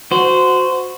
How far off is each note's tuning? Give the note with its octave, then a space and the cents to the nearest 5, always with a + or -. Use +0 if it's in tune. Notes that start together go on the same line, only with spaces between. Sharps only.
F#4 -10 C5 -20